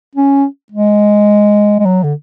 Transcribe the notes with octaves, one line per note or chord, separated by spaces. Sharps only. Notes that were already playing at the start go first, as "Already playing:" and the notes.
C#4
G#3
G#3
F#3
D3